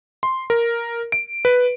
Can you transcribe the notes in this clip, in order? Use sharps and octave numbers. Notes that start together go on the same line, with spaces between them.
C6
A#4
D7
B4